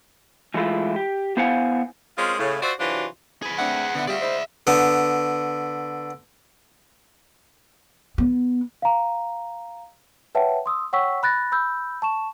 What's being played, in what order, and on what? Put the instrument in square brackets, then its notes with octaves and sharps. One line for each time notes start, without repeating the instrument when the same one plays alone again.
[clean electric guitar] E3 G#3 A3 E4 F4
G4
B3 E4 C5 F5 F#5 G#5
[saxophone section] G#3 C4 C#4 F4 G#4 A#4
A2 C#3
F4 F#4 C5 D5 E5 F#5
C3 E3 F#3 D4 F4 F#4
[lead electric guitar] G#4 B4
[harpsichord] A3 C4 D4 [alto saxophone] F#5
[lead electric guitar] D3 [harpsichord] B3 E4
[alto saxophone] G3 [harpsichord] F4 F#4 G#4 [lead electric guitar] D5 E5
[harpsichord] G#3 E4 [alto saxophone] C5
[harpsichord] D3 B3
[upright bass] B3
[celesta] F5 A#5
B4 C#5 E5 F#5 G5 A5
C6 D#6 E6
C#5 F#5 G5 C#6 E6 B6
B5 F#6 A6 A#6
B5 E6 G6
A5 C#6 E7